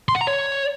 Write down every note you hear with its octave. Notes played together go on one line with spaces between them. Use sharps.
C6
F#5
A#5
C#5